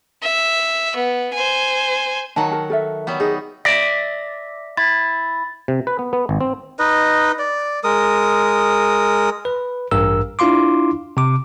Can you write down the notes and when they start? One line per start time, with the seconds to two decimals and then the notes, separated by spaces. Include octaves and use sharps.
0.23 E5
0.96 B3
1.33 C5 G#5
2.36 D#3 F#3 F#5 A5 A#5
2.51 A#4 A5
2.70 A4 A#4 E5
3.07 F#3 G3 B3
3.20 D#4 G#4
3.65 D5 E5 A#6 B6
4.77 E4 A6
5.68 C3
5.87 B4
5.99 B3
6.13 B3
6.29 G#1
6.41 C4
6.79 D#4 B4 D#5
7.39 D5
7.84 G#3 A#4 D#6
9.45 B4
9.91 A1 G2 A#4 E6
10.39 D4 E4 F4 F5 C6 D6
11.17 C3 D6